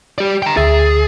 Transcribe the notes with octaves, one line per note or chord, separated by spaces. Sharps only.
G4 D5
G5 A#5
D2 G#4 E5 A6